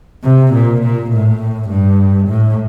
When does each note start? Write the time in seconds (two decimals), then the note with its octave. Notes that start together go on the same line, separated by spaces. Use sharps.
0.24 C3
0.54 A#2
0.83 A#2
1.12 A2
1.69 G2
2.28 A2